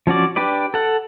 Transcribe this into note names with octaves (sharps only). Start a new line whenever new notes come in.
F3 C#4 F#4 D5
D4 G4 B4 D5
A4 F#5